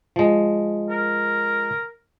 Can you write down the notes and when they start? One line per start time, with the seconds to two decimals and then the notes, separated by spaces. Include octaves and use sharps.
0.16 F3 G#3
0.90 A#4